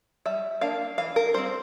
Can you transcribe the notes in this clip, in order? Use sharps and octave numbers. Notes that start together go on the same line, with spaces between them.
G3 E5
A#3 D4 F5
E3 F5
A#4
G3 C4 C5